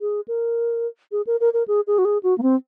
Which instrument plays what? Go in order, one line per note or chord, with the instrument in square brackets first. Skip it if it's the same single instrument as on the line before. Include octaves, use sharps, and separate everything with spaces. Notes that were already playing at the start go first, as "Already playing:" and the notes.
[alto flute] G#4
A#4
G#4
A#4
A#4
A#4
G#4
G#4
F#4
G#4
F#4
A#3
C4